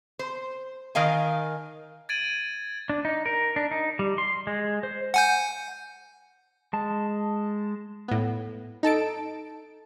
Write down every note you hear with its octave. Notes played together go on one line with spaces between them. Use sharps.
C5
D#3 A#4 D#5 F5 G#5
G#6 A6 D7 D#7 F#7
D4
D#4
A#4
D4
D#4
G3
C6
G#3
C5
F#5 G#5 G6
G#3 A5
A2 B3
D#4 A4 A5 D7